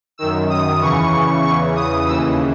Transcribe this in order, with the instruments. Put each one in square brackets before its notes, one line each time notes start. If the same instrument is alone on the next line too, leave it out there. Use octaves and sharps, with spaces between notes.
[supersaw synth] F#2 D#3 E6
D#6
E2 C#3 E3 C#6
E2 C#3 E3 C#6
D#6
D#2 C#3 E3 E6